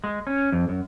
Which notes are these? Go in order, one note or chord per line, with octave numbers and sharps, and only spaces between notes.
G#3
C#4
F2
F#2